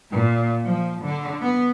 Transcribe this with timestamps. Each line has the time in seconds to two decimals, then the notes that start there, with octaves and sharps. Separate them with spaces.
0.10 A#2
0.64 F3
1.04 D3
1.41 B3